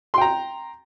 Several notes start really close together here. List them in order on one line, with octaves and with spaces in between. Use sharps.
C6 G5 A#5